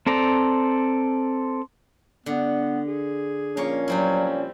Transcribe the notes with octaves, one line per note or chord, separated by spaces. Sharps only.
C4 A4 D5 A#5
D3 B3
G#4
A#2 F3 A#3 C#4 C#5
F#3 G3 C4 E4